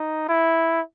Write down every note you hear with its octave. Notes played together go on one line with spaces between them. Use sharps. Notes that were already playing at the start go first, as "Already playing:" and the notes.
Already playing: D#4
E4